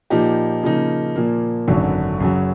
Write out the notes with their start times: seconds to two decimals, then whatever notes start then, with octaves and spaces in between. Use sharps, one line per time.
0.10 A#2 F3 A#3 D#4 G4
0.63 C#3 F3 A#3 D#4
1.16 A#2 F3 A#3
1.68 G#1 F#2 D3 F#3
2.20 F#2 C#3 F#3